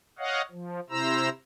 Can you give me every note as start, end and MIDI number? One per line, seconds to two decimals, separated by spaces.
0.19 0.42 73
0.19 0.42 75
0.19 0.42 77
0.19 0.42 78
0.51 0.80 53
0.90 1.29 48
0.90 1.29 64
0.90 1.29 72
0.90 1.29 82
0.90 1.29 88